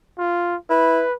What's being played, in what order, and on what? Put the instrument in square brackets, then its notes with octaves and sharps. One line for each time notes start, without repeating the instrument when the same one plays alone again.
[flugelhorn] F4
[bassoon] E4 [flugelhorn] B4